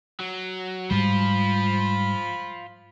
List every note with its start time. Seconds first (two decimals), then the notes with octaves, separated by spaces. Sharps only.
0.20 F#3
0.91 G#2 G3 F4 C5 B5